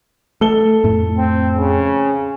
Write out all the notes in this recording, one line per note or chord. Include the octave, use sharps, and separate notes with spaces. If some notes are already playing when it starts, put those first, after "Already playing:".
A3 A4 G7
F2 A2 A3
C4
C#3